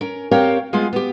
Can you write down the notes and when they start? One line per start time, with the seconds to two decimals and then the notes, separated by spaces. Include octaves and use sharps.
0.01 C#4 A#4
0.31 C4 G4 A#4 C#5 F5 G5
0.73 G#3 B3 F4 G#4 F5 G#5
0.93 B3 G4